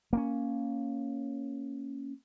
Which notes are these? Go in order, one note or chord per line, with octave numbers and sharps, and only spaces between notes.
A#3 C4 C#4